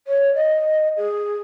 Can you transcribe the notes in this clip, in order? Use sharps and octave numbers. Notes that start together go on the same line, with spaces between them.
C#5
D#5
G#4